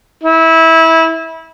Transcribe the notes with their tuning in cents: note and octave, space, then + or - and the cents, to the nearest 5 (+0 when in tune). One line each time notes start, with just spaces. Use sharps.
E4 -20